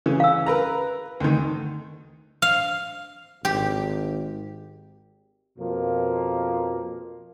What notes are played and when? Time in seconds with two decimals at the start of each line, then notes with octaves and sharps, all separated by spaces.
0.06 C#3 E3
0.20 F5 E6
0.46 A#4 B4 A#5
1.20 D2 D#3
2.42 F5
3.45 G#1 G4
5.59 F2 B2 F3 A#3